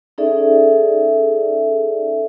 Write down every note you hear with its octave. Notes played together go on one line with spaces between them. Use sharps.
C#4 D#4 G#4 A4 D5 E5